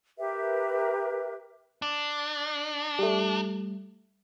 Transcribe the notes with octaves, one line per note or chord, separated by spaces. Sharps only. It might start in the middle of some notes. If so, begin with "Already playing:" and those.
G4 A#4 B4 E5
D4
G3 A3